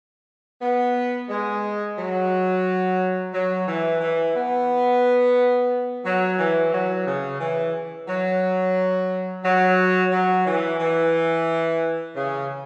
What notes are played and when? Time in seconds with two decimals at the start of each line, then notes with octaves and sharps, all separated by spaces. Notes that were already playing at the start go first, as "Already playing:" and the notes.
0.61 B3
1.29 G#3
1.97 F#3
3.33 F#3
3.67 E3
4.00 E3
4.34 B3
6.05 F#3
6.38 E3
6.72 F#3
7.06 C#3
7.40 E3
8.07 F#3
9.43 F#3
10.11 F#3
10.45 E3
10.79 E3
12.15 C#3